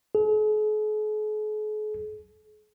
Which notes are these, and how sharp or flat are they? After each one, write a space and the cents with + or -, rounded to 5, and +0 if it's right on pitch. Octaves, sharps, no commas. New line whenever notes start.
G#4 +45